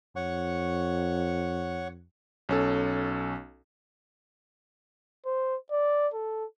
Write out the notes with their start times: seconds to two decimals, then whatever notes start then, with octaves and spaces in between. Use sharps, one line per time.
0.16 F2 C#5 F#5 C#6
2.49 B1 C#4 A4
5.25 C5
5.71 D5
6.14 A4